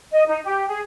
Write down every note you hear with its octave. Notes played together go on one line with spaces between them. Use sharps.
D#5
D#4
G4
G#4